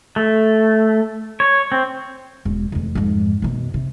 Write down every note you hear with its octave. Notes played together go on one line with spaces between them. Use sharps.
A3
C#5
C4
E1
F1 E2
F2 G#2
F#2 B2
C3